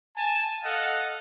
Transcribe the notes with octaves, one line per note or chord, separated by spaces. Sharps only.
G#5 A5
A4 D#5 F5 F#5